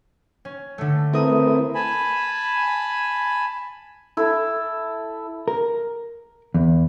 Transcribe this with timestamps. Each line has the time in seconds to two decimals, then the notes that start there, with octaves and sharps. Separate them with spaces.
0.45 C#4
0.78 D3 A3
1.13 A3 C4 E4 A#4 B4 D#6
1.75 G#5 A5 B5
4.17 E4 A4
5.48 A#4
6.54 E2